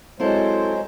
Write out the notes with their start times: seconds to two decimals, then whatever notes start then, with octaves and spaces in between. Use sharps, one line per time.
0.20 F#3 G#3 C4 E4 A4 C5